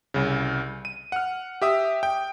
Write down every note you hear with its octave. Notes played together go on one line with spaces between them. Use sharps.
C2 C#3
D#7
F#5 F6
G4 E5 D#6
G5